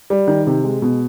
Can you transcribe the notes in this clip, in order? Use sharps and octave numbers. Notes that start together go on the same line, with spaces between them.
G3
D#3
C3
G#3
B2